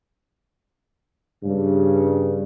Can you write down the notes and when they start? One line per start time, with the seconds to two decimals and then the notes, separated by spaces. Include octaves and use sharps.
1.44 G2 C#3